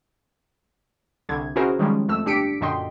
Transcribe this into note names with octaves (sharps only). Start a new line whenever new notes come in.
C2 D3 G#6
C#4 E4 F#4 G#4 A#4 C5
D#3 F3 G3 G#3 C#4
F2 A3 E6
G1 D4 G4 B6 C#7 D7
F#2 A#2 D3 D#5 G5 C6